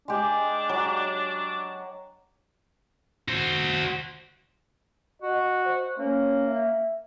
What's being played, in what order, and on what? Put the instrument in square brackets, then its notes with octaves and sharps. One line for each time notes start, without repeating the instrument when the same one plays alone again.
[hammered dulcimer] G#3 G4 [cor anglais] D4
[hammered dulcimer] F#3
[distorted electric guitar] F#4 C5
[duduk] F#4 [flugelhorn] D#5
[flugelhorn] C5
[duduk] A#3 [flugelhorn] C#4
[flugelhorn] E5